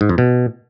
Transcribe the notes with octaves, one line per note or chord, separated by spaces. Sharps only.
G#2
F2
B2